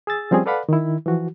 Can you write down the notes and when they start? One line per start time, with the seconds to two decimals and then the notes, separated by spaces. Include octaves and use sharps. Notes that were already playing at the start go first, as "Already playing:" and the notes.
0.07 G#4 E6 A6
0.31 F3 G3 C4 C#4 G#4
0.46 A4 B4 D5 F5 F#5 B5
0.69 D#3 E4
1.06 E3 F3 F#4